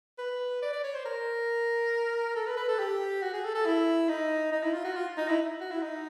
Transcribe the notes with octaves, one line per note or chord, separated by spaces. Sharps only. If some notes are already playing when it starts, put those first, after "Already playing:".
B4
D5
D5
C#5
C5
A#4
A4
B4
B4
A4
G4
F#4
G#4
A4
A4
E4
D#4
D#4
E4
F4
F#4
F4
D#4
E4
F#4
E4
D#4